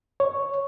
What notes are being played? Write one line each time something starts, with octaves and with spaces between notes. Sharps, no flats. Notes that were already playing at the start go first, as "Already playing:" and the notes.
C#5